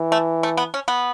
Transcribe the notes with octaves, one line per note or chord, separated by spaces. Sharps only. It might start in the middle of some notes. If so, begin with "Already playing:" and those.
Already playing: E3
A3
A3
B3
C#4
B3